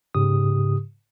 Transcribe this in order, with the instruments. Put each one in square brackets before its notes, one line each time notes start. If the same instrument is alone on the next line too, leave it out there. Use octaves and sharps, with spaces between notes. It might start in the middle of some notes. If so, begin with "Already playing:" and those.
[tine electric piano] G#2 C#3 G4 D#6